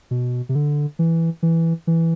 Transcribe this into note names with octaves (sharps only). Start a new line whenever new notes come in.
B2
C3
D3
E3
E3
E3